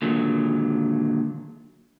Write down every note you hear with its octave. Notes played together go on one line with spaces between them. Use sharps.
A#2 D3 D#3 F#3 G#3